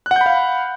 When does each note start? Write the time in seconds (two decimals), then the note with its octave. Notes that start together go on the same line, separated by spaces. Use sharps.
0.06 F#6
0.11 F#5
0.16 G6
0.21 B5
0.26 F5